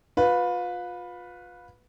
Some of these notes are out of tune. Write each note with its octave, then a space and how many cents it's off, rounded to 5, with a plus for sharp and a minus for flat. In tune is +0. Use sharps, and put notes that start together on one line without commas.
F4 +30 B4 +0